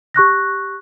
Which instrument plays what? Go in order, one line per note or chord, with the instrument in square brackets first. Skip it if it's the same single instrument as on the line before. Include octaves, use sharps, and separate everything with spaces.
[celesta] G4 C#6 F#6 A#6